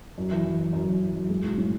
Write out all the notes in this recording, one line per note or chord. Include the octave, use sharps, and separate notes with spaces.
F#2
E3
E3
E3
F#2
F#2
F#2
F#2
G#3
B1
A2